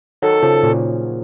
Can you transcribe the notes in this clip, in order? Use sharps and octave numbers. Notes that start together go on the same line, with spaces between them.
D#3 F#3 A4
C#3 F3
A#2 C#3